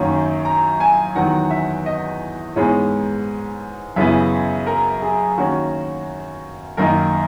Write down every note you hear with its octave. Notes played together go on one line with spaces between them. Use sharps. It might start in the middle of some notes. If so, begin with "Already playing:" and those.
Already playing: F#2 D#3 F#3 A#3 C#4
A#5
G#5
E2 D#3 F#3 F#5
E5
D#5
G#2 E3 G#3 B3 C#5
F#2 C#3 E3 B3 E5
A#4
G#4
D#3 A#3 C#4 F#4
F#2 D#3 A#3 D#4 A#4